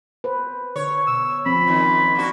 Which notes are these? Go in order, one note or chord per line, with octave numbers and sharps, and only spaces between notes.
B4 C5
D3 C#5
B2 E6
F3 C4 C#4 B5
A#2 D#3
A#3 D4 F#4